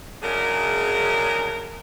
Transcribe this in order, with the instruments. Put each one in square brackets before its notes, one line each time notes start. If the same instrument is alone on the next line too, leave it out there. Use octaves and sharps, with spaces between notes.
[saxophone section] F#2 C#3 G#3 D4 G#4 A#4